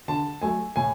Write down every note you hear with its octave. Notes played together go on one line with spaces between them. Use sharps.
D3 A5
F#3 A3 G#5
A2 G#5